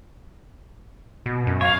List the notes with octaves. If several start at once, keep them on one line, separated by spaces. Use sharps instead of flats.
B2
F#2
C#5 F5